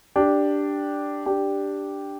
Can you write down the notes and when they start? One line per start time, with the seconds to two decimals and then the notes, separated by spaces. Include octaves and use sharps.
0.16 D4 G4
1.26 D4 G4